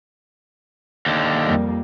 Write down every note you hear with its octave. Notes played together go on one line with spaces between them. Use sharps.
D#2 D3
F2 G3 A#3